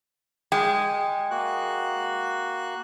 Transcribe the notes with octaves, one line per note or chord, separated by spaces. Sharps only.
G#3 G5
A#3 F#4 F#6